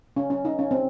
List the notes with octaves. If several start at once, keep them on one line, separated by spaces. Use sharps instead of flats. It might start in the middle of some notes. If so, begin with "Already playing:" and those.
C#4
C#4
D#4
C#4
C4